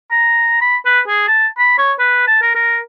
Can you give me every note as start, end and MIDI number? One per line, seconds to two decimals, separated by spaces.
0.11 0.61 82
0.61 0.76 83
0.85 1.00 71
1.08 1.26 68
1.28 1.47 81
1.58 1.74 83
1.78 1.93 73
1.99 2.23 71
2.27 2.38 81
2.42 2.54 70
2.55 2.79 70